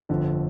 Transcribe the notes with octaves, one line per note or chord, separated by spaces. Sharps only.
G1 F2 D3 F3